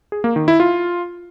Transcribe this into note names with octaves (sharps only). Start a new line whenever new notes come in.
G#4
A#3
D#3
E4
F4